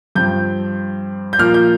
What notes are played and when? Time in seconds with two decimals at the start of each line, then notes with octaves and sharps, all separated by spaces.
0.15 G2 F3 C4 G6
1.33 G6
1.39 A#2 F3 A#3 F6
1.54 G6